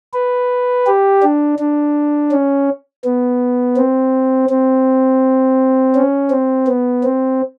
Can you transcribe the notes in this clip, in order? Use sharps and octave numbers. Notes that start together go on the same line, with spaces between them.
B4
G4
D4
D4
C#4
B3
C4
C4
C#4
C4
B3
C4